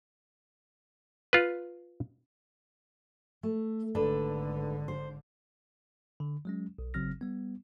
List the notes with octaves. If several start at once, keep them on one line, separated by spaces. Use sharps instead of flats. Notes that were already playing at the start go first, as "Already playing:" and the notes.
F4 B4
A3
G#1 D3 D4 A4 B4
C5
D3
F#3 G#3 C#4
B1
G#1 C#3 F#3 C4 F6 A#6
G3 B3